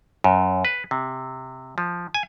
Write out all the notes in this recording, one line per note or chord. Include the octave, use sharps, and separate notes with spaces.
F#2
B4
C3
F3
G#5